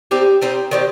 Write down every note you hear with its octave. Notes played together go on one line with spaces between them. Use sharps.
G3 C4 D#4 G4
G3 C4 D#4
D#3 G3 C4 G4